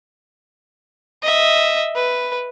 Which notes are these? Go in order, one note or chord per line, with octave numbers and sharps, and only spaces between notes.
D#5 E5
B4